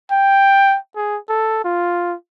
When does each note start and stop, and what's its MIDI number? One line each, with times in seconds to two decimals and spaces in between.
0.11 0.77 79
0.96 1.18 68
1.29 1.64 69
1.64 2.15 65